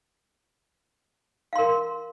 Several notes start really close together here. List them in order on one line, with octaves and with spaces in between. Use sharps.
F5 C6 A#4